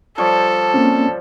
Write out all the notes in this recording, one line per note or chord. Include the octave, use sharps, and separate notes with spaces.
F3 G3 A4 C#5
A#3 C4 C#4